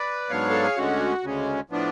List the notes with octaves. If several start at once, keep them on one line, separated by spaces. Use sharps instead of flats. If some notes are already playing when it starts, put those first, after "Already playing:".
Already playing: B4 D5
G#2 F#3 B3 D4 C#5 F5
A4
G#4
D2 D3 G#3 C#4 F#4
D2 C#3 G#3 C#4
A2 F3 B3 D4